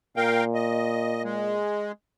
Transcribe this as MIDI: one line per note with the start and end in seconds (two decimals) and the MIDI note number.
0.16 1.64 46
0.16 0.44 70
0.16 0.44 77
0.16 0.44 79
0.54 1.23 75
1.24 1.92 56